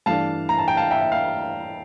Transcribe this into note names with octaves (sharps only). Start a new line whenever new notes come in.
G2 E3 A3 D4 F5 A5
A#5
A5
G5
F5 A5
E5 G5
E5
F5